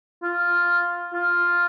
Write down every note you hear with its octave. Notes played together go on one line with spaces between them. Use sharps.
F4
F4